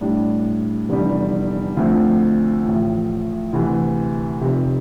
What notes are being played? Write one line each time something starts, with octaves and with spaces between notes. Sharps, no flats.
A2 G3 D4
F1 E2 D3 G3
D2 D3 F3 A3 C4
A1 A2 F3
D2 C3 E3
F1 F2 C3